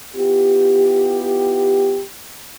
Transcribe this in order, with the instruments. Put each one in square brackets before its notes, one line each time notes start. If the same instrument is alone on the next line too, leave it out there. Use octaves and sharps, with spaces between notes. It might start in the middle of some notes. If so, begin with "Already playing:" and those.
[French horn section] B3 E4 F4 G4